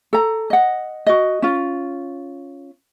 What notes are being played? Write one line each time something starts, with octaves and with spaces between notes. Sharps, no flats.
A4 A#5
D#5 F#5
F#4 D#5
C#4 F4